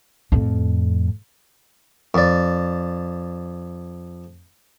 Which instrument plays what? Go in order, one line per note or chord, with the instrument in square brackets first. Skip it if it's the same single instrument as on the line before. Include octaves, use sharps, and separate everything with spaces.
[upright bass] F2 A2
[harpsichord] F2 D5